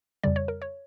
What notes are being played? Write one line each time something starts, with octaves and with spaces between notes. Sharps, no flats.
F2 C#3 G3 D5
C#5
A#4
C#5